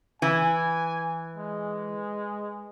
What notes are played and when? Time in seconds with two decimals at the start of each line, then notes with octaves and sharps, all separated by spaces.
0.22 E3 G#5
1.37 G#3